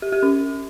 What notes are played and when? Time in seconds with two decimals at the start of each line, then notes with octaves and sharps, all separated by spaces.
0.02 G4
0.12 G4
0.23 C#4